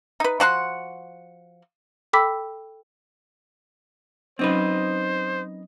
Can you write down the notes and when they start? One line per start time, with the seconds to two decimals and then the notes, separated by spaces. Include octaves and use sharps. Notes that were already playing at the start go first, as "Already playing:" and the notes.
0.20 D#4 B4
0.40 F3 F#4 F#5 C6
2.13 A4 G5 B5 D6 E6 B6
4.39 F#3 C4 C#4 D#4 B4 C5